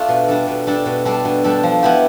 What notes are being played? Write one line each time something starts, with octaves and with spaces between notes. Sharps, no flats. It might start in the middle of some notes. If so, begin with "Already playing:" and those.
Already playing: A3 D4 F4 A4
B2
G3 D4 A4
B2
G3 D4 A4
B2
G3 D4 A4
B2
G3 D4 A4
F3
B3 E4 G4